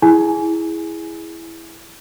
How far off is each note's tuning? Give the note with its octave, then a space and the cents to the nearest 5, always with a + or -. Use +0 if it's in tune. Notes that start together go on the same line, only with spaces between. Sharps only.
E4 +0 G#4 +0 G#5 +15